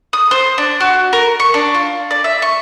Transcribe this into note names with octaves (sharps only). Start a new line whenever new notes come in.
D#6
C5
D4
F#4
A#4
C#6
D4
F4
D5
E5
C#6